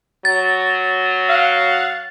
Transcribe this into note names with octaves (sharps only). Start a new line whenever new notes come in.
F#3 A6
F5 F#5